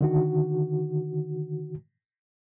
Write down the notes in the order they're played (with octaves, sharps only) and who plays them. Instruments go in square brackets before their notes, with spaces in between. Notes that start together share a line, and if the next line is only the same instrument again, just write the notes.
[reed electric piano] D3 D#3 F#4